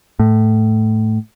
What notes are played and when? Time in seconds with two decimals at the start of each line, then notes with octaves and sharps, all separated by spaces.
0.20 A2